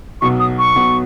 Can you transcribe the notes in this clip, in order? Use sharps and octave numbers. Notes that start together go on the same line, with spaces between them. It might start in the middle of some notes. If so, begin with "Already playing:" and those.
B1 B2 F#3 B3 C#6
D#6
C#6
B1 B2 F#3 B3